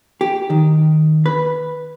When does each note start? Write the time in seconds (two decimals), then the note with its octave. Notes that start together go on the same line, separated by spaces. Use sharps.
0.21 G4
0.50 D#3
1.26 B4